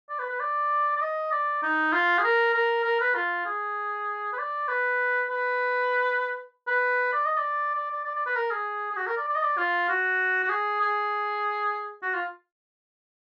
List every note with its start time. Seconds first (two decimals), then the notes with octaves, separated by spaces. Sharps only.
0.09 D5
0.19 B4
0.29 B4
0.40 D5
0.96 D5
1.01 D#5
1.32 D5
1.63 D#4
1.92 F4
2.18 G#4
2.24 A#4
2.54 A#4
2.84 A#4
3.01 B4
3.15 F4
3.45 G#4
4.33 B4
4.38 D5
4.68 B4
5.30 B4
6.67 B4
7.13 D5
7.25 D#5
7.37 D5
7.75 D5
7.90 D5
8.04 D5
8.15 D5
8.26 B4
8.36 A#4
8.51 G#4
8.91 G#4
8.97 F#4
9.07 A#4
9.17 D5
9.28 D5
9.35 D#5
9.43 D5
9.58 F4
9.89 F#4
10.44 F#4
10.49 G#4
10.81 G#4
12.02 F#4
12.14 F4